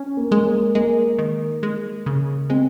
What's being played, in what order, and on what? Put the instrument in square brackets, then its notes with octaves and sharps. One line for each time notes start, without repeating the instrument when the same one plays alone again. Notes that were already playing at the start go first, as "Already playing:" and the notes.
Already playing: [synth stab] C#4
[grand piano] A#3
[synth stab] G#3
[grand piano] A#3
[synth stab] G#3 [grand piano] A#3
[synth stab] D#3
G#3
C#3
[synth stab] G#3 [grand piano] C4